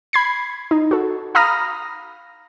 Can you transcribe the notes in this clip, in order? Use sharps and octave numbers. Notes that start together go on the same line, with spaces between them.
B5 G#6 C7
D#4
F#4 A4
F5 A#5 B5 D#6 F6 A#6